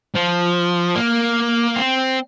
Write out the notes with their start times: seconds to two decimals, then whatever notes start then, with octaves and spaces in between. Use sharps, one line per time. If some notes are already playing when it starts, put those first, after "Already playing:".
0.15 F3
0.95 A#3
1.76 C4